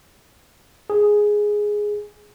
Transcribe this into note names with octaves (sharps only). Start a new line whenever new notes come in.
G#4